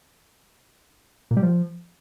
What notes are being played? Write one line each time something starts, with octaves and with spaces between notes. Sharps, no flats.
A#2
G3
F3